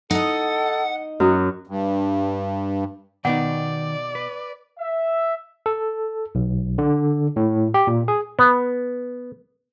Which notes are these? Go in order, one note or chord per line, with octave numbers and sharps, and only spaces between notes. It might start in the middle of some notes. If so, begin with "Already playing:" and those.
D#4 A4 D#5 F#5
F#2 F#4 D#6
G2
B2 D#3 B3 D#4 D5 F#5 G5
B4
E5
A4
B1
D3
A2
G4
A#2
G#4
B3